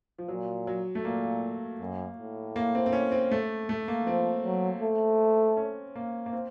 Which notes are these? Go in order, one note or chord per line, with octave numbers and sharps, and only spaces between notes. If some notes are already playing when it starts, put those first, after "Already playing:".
F3
A#2 F#3
F#3
A3
A#2 A#3
F#2
A2
A#3
C4
C4
C#4
C4
A3
A3
A#3
F3 C4
F#3
A3
C#4
A#3
A#3
C4